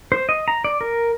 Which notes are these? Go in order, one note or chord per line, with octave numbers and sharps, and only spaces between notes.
C5
D#5
A#5
D5
A#4